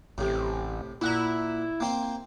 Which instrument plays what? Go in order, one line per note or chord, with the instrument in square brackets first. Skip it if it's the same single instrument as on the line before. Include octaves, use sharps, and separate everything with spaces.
[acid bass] A1 [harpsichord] A2 C3
[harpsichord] A#2 F#5 A#5 [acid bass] E4
[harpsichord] A#3 C4 C6